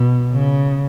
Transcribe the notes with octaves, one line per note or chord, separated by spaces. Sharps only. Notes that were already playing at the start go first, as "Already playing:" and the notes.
Already playing: B2
C#3